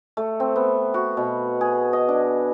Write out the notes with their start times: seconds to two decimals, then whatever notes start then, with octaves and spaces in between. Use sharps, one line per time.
0.17 A3
0.40 C4
0.56 B3
0.94 F#4
1.17 B2
1.61 G#4
1.93 D#5
2.09 D4